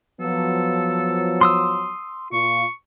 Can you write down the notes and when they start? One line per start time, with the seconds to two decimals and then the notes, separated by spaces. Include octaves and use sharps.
0.21 F3 F#3 B3 A4
1.41 C6 D#6 E6
2.32 A#2 F4 C#6